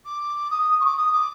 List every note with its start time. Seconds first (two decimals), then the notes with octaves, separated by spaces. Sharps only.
0.05 D6
0.50 D#6
0.62 D#6
0.80 C#6
0.85 D6
0.97 D#6
1.12 D6